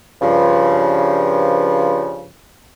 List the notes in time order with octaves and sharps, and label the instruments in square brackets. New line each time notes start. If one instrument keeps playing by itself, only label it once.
[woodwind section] G2 C#3 F3